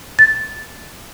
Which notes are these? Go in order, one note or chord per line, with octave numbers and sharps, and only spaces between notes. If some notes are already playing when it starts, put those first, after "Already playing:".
A6